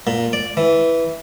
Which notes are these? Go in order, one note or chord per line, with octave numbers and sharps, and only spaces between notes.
A#2
D5
E3